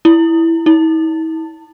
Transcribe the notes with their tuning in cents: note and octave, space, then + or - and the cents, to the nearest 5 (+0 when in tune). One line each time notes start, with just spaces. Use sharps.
E4 +0
E4 -45